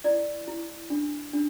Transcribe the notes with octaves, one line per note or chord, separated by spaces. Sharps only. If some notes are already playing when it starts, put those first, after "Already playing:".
E4 D5
E4
D4
D4